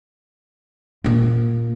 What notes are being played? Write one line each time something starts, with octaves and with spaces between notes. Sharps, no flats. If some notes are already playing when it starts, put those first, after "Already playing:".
A#2 A#3